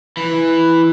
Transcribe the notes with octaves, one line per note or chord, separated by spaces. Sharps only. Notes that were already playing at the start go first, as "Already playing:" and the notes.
E3